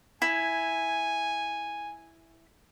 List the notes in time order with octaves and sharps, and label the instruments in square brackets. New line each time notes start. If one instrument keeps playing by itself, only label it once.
[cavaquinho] E4 [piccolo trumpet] G#5